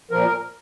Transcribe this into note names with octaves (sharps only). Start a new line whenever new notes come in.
A#2 F3 A#4